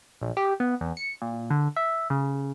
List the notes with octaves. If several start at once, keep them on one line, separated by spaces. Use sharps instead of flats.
A#1
G4
B3
E2
C#7
A#2
D3
E5
C#3